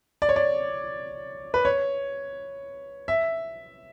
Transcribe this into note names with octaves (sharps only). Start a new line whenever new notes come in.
D5
C#5
D5
B4
C#5
E5